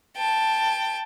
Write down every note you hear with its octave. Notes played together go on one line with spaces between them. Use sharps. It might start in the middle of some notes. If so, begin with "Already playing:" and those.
G5 A5